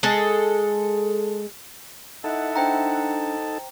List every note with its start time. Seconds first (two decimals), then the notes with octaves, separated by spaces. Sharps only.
0.03 G#3 G#4 A4
2.24 D#4 E4 A4 D#5 E5 F#5 A5
2.56 D4 C5 G5 A#5